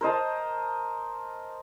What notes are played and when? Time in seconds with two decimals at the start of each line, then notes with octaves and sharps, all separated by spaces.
0.01 A#4 C5 D#5 A5